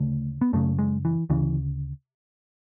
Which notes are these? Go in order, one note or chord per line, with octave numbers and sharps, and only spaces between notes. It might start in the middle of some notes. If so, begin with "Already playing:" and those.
Already playing: D2 C#3 A3
B3
F#2 C#3 A3
G#3
E3
D2 C#3 E3